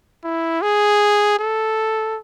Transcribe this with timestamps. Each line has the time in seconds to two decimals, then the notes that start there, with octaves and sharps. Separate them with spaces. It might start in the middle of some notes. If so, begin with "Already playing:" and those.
0.24 E4
0.62 G#4
1.39 A4